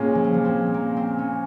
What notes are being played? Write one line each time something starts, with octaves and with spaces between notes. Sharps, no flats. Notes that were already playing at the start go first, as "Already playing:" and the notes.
Already playing: A#2 G#3 C#4
F3
G3
F3
C4
A#3
C4
C#4